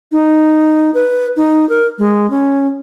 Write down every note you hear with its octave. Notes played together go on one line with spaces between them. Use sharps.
D#4
B4
D#4
A#4
G#3
C#4